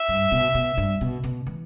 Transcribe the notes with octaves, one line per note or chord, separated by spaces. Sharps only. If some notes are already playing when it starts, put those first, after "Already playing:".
Already playing: E5
G2
B2
B2
G2
B2
B2
E3